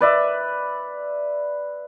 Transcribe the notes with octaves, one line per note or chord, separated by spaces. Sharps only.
B4 D5 E5